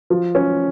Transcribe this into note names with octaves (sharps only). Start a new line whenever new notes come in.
F3
C#4